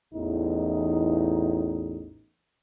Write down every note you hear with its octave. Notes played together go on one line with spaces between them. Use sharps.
A1 E2 D#4